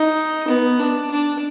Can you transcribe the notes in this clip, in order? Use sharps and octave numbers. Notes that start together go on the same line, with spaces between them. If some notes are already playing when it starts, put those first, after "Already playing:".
Already playing: D#4
B3
D4
D4